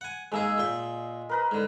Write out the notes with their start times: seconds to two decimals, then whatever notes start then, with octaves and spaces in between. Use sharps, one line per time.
0.01 F#5 G#5
0.32 G#2 G#3 A#3 G#4 E6
0.58 A#2 G5
1.29 A#4 B4 A#5
1.51 G#2 D3